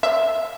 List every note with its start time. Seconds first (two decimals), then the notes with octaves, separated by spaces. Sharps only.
0.03 E5